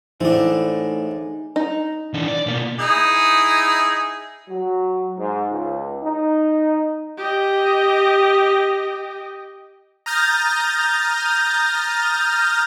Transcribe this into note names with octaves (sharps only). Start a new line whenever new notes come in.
A2 E3 C4 D4 D#4 G#4
D#4
E3 D4
D5
B2 A#3
D#4 E4 G#4
F#3
G#2
C#2
D#4
G4 D#5
A#5 D#6 F6 G6 A6 A#6